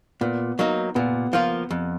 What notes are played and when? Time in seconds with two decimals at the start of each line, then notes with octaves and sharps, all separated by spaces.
0.21 A#2 B3
0.59 F#3 A#3 D#4
0.95 A#2 B3
1.33 F3 A#3 F4
1.71 F2